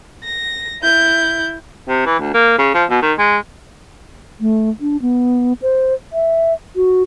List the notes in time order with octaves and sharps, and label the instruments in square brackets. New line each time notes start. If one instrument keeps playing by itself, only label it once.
[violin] A#6
E4 G6
[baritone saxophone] C3
E3
D2
A#3
C#3
F3
B2
D#3
G#3
[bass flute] A3
D4
B3
C5
E5
F#4